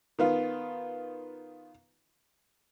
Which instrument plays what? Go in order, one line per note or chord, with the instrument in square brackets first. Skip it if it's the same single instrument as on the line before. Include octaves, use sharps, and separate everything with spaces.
[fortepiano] D#3 B3 F4